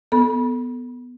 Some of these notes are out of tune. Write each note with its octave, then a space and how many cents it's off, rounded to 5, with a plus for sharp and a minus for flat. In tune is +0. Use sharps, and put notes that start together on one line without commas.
B3 +0 A4 +0 B5 -35